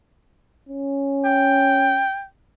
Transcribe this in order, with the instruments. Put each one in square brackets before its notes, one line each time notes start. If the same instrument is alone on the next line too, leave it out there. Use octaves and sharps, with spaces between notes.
[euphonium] C#4
[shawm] G5